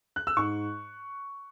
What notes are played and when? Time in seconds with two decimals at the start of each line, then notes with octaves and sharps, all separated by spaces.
0.16 F#6
0.27 E6
0.37 G#2 C#6